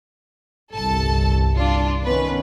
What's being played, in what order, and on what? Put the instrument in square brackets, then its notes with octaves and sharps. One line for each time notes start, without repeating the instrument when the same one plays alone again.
[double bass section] G1 C2 [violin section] A4 A5
[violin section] D4 F4
[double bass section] D#3 B3 C#4 [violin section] B4